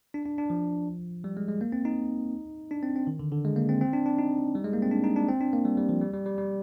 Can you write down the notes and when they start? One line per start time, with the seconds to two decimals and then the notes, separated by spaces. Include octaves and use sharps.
0.14 D4
0.26 D4
0.38 D4
0.50 F3
1.24 G3
1.37 G#3
1.48 G#3
1.61 A#3
1.72 C4
1.85 D#4
2.71 D4
2.83 C4
2.96 C4
3.07 D#3
3.19 D3
3.32 D3
3.45 G#3
3.56 A#3
3.69 C4
3.81 C4
3.93 D4
4.06 D4
4.18 D#4
4.55 G3
4.64 G#3
4.73 A#3
4.82 C4
4.91 D4
5.04 D#4
5.16 D4
5.28 C4
5.41 D4
5.53 A#3
5.65 G3
5.77 G3
5.89 F3
6.01 G3
6.14 G3
6.26 G3
6.38 G3